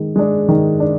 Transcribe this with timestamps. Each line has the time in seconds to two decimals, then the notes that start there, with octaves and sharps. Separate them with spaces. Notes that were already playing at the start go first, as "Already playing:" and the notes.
Already playing: D#3 G#3
0.16 G#3 D4
0.49 D#3
0.80 D4